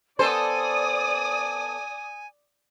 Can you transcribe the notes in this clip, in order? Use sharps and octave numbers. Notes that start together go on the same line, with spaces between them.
B3 A4 C5 D5 G#5 D#6